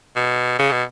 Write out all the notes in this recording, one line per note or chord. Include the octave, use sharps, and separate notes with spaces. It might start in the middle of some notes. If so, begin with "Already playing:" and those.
B2
C#3
B2